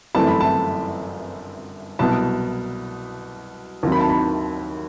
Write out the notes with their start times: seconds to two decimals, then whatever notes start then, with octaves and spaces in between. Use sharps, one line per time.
0.15 G1 F#2 E3 A3 C4 A5
0.28 B5
0.41 A5
1.99 C2 B2 F#3 B3 A5
3.83 D#2 D#3 F#3 C4
3.92 B5
4.01 A5
4.09 B5